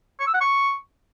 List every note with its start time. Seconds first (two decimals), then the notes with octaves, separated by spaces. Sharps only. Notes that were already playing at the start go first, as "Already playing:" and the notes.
0.20 C#6
0.27 E6
0.34 F#5
0.41 C#6